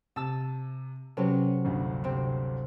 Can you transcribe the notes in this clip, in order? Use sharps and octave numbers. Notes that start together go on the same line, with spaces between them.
C3 A5 E6
C3 F#3 C#4 A4 B4
G1 D2 G2
C3 C4